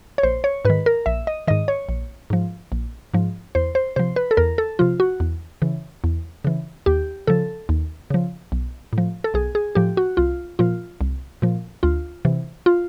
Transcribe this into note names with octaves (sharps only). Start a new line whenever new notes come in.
C#5
A#1 C5
C#5
G#2 D#3 B4
A#4
A#1 E5
D#5
G#2 D#3 D#5
C#5
A#1
G#2 F3
A#1
G#2 F3
E2 C5
C5
C3 F3 C5
B4
A4
E2 A#4
A4
C3 F3 F4
F#4
E2
C#3 E3
E2
C#3 E3
D#2 G4
C#3 F3 A4
D#2
C#3 F3
B1
A2
F3
A4
B1 G#4
G#4
A2 F3 G4
F#4
C2 F4
A#2 F3 F4
C2
A#2 F3
D2 F4
C3 E3
F4